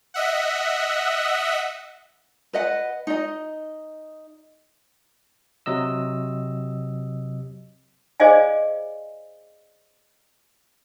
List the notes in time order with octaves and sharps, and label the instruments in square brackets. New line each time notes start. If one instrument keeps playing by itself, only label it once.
[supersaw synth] D#5 E5 F#5
[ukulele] B4 D#5 F#5
D#4 D#5
[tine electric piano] C3 F#3 D#5 E6
[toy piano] G#4 C5 D5 D#5 F5 G#5